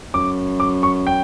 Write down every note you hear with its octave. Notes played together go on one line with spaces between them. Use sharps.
F#2 D6
D6
C#6
G5